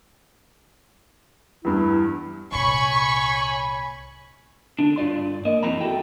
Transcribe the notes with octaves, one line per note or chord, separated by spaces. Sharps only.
E2 G2 E4
C2 A#2 C#5 G#5 B5 C#6
D3 D4
G2 F4 D5 C6
A#3 D#5
F#2 E3 F#3 C4 A#5 B5
G3 E4 F#4 A4 G5